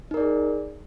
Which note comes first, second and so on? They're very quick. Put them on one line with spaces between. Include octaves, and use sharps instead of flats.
D#4 A#4 D5 G#4